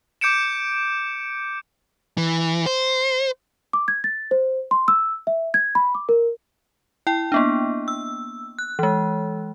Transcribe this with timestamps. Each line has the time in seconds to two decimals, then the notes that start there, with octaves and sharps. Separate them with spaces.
0.21 D6 G6 C#7 D7 E7
2.17 E3
2.66 C5
3.73 D6
3.88 G#6
4.04 A6
4.31 C5
4.71 C6
4.88 E6
5.27 E5
5.54 G#6
5.75 B5
5.95 D6
6.09 A#4
7.07 E4 G5
7.32 A#3 B3 D4
7.88 E6
8.59 F#6
8.79 E3 G#3